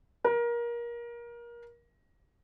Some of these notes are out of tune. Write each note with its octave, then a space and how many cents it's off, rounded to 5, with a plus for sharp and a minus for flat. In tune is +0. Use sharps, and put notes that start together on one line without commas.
A#4 +25